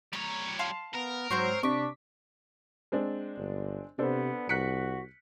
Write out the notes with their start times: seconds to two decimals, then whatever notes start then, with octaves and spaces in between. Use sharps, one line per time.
0.13 G3 C#5 A#5
0.59 F5 A5 C6
0.94 B3 A#4
1.31 G#2 F#3 C4 C5 C#5 C#6 C7
1.63 C3 D4 C#6 D6 B6
2.92 G#3 C4 D4
3.37 G1
3.99 C3 B3 D4 A4 C5
4.49 C2 F#4 F#6 B6 C#7